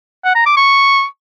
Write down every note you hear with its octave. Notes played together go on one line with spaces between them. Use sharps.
F#5
A#5
D6
C#6